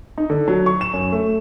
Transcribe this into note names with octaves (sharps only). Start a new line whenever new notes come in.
D#4
D3
F#3
C#6
E7
F#2
A3